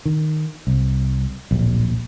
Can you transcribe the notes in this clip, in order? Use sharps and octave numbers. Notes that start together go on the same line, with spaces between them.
D#3
C2
D1 A#1